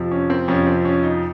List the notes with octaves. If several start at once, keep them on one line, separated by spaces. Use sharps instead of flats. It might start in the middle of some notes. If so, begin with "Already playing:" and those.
Already playing: F2 C3 F3
C#4
C4
F2 C3 F3 C#4
C4
C#4
D#4